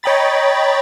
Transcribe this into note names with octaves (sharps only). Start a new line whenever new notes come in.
C#5 D#5 G5 A#5 B5 A6